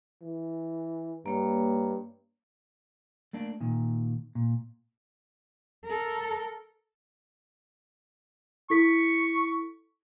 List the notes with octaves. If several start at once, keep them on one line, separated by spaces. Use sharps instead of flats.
E3
G2 A#3 C#5
A3 A#3 D4
A#2 D#3
A#2
A4 A#4
E4 A4 C#6 B6